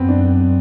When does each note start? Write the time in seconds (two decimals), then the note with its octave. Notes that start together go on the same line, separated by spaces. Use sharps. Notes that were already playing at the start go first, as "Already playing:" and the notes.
Already playing: F#2 B3 C4
0.09 D4